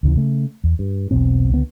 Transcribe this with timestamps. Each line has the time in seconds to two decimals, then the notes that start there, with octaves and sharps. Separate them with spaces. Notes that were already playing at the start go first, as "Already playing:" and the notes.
0.03 D2 C#3 E3
0.15 C#3 A3
0.64 E2
0.79 G2
1.11 E1 B1 B2 C4
1.50 C#2 D3 B3